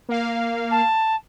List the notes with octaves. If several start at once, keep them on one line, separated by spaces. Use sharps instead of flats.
A#3 F5
A5